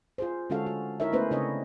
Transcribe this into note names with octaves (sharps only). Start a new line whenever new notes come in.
F4 G#4 C5
D3 G#3 C#4 F#4 A4 F5
F#4
D#4 E4 A#4 C#5 E5
A3 B3 C#4 E4 B4 C5
C#3 C4 D4 E4 C#5 D#5